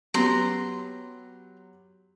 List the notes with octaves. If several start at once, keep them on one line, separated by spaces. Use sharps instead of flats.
F#3 B3 G4 A#5 C6